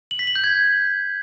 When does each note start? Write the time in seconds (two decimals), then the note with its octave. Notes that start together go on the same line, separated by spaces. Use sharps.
0.11 F#7
0.19 B6
0.27 F#7
0.36 G6
0.44 G#6